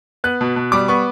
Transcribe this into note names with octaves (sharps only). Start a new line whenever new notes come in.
B3 F#6
B2
B2
G3 D6
B3 C#6